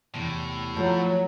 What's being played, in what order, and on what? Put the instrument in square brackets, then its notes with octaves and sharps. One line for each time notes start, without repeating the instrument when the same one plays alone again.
[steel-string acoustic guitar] E2 C3 [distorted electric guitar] A2
[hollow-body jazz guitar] F3 [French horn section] F#3 [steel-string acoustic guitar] A3